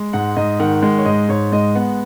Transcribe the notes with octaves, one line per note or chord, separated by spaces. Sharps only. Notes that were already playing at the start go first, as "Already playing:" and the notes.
Already playing: G#3
G#2 F#5
G#2 D#5
D#3 F#5
G#3 F#5
C#5
G#2 D#5
G#2 C#5
G#3 D#5
B3 F#5